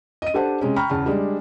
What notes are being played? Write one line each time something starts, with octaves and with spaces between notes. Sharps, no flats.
D#5 D#7
D4 G4 A4 C5 F#5 A5
C3 G#3 C#4
G5 A#5 B5 C#6 F6
E2 C#3 A5 F6
G3 G#3 D4